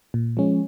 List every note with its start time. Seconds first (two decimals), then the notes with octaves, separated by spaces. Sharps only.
0.14 A#2
0.37 F3 G#3 C#4